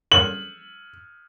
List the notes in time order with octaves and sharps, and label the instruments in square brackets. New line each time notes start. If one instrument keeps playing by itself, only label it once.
[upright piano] F#7